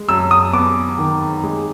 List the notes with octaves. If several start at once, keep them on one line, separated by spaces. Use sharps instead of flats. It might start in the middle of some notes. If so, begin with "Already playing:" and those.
Already playing: G#3
F#2 E6
D#6
B3 D6
D#3
G#3